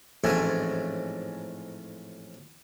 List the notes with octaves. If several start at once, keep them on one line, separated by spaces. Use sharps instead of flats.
A1 F2 G#2 A3 G#5